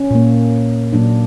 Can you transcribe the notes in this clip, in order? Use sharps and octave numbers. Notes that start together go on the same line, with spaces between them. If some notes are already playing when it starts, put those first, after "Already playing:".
Already playing: C#4
A#2 A#3
A#2 F#3 A#3 D4